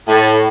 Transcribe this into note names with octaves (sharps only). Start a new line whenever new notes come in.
A2